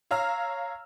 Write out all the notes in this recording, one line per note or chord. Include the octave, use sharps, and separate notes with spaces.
C#5 F5 A#5 E6 F6